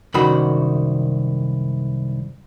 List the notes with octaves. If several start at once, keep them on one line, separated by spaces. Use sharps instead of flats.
C2 F#2 D#3 F#4 B5